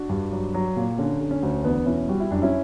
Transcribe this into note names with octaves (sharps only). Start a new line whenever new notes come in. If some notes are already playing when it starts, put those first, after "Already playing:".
Already playing: D4 F#4
G2
F#3
F#3
A#2
D3 C#4
D3
C#4
D2
E2 B3 D4
B2 C#4 E4
G3 F#4
E4
F#2 D4
C#4 E4